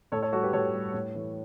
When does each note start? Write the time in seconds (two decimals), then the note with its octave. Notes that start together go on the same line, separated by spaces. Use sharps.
0.12 A2 A4 C#5
0.22 A4 C#5
0.33 G3 F#4 A4
0.43 G4 B4
0.53 A2 A4 C#5
0.74 G3
0.94 A2
1.15 E3 A3